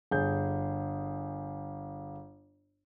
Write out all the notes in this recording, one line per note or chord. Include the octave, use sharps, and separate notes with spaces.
G1 G#4 G6